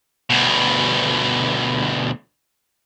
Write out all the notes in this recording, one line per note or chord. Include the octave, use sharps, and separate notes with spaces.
D2 B2